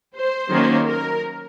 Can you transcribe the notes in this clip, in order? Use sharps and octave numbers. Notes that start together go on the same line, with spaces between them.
C5
D#3 F#3 A#3 C#4
A#4